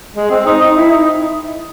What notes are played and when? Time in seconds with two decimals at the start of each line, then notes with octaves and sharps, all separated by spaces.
0.16 G#3
0.31 C4
0.46 D#4
0.62 D#4
0.76 E4
0.91 D#4